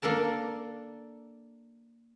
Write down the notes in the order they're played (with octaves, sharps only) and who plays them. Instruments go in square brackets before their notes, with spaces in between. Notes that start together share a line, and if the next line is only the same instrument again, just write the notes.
[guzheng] A#3 D4 A4 A#4 A5